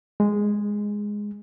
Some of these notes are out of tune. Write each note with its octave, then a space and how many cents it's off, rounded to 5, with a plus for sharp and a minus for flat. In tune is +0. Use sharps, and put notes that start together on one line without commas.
G#3 -5